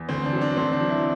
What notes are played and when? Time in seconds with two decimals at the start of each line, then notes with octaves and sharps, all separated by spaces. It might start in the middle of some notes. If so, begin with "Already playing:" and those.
Already playing: E2
0.09 D2 C4
0.25 D4
0.33 F#3
0.41 D4
0.57 D2 C4
0.73 D4
0.81 F#3
0.90 E4